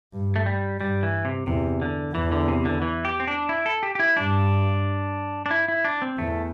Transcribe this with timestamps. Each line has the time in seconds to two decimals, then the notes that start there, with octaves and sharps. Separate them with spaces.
0.13 G2
0.36 A3
0.46 G3
0.80 G2 G3
1.03 E3
1.25 C3
1.47 E2 C3
1.82 D3
2.15 E2 E3
2.32 D3
2.48 C3
2.65 D3
2.82 E3
3.05 G4
3.20 C4
3.27 D4
3.49 E4
3.66 A4
3.83 G4
3.95 G4
3.99 E4
4.17 G2 D4
5.46 D4
5.51 E4
5.68 E4
5.85 D4
6.02 C4
6.18 E2 A3